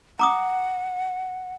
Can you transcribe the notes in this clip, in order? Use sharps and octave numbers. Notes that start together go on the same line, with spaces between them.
F#5 A#5 D6 D#6